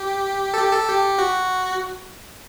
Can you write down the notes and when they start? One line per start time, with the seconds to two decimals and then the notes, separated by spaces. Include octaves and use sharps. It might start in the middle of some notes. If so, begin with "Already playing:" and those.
Already playing: G4
0.54 A4
0.57 G4
0.72 A4
0.88 G4
1.19 F#4